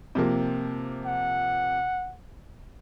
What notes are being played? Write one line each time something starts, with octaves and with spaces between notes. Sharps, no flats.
C3 F3 A#3
F#5